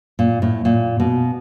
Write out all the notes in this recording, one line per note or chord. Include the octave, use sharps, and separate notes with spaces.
A#2
A2
A#2
B2